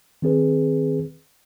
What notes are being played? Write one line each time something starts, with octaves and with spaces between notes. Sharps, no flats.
D#3 C4 G#4 B4